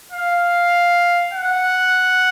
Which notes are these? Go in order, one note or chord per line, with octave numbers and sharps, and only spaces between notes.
F5
F#5